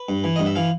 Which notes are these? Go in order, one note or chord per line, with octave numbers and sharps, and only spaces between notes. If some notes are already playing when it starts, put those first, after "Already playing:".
Already playing: B4
G2
E3
G2 D#5
E5
E3 F5